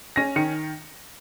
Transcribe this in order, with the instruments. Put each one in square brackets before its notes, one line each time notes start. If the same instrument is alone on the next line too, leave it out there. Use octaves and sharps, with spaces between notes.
[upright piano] C#4 A#6
D#3 C#7